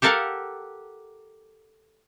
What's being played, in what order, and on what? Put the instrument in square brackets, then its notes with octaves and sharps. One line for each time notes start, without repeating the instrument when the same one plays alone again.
[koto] G4 A4 A#4 F5 F#5 A5